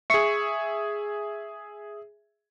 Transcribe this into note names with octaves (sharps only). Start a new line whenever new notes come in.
G#4 E5 C#6 C7 C#7